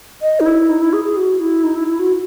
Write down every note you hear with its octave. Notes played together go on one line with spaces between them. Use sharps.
D#5
D#4
E4
D#4
E4
G#4
G#4
F#4
E4
D#4
E4
E4
F#4